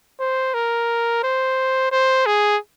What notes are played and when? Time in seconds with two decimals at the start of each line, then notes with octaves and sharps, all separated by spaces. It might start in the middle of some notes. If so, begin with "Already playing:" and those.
0.20 C5
0.54 A#4
1.23 C5
1.91 C5
2.26 G#4